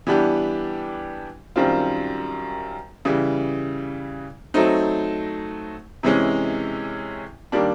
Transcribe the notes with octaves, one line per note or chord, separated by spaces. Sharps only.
E3 G3 B3 D4 G4
F#2 D#3 G3 C4 F4
C#3 E3 G3
F#3 A3 C4 D#4
C3 E3 G#3 C#4
D#3 G3 A#3 D4